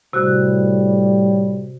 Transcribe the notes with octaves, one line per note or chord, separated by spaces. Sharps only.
A2 C3 G3 F#4 F#6